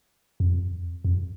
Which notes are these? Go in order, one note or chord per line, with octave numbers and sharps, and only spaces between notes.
F2
F2